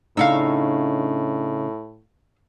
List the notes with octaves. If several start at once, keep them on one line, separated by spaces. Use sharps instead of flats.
A2 C#3 D4 D#4 F5 C#6 E6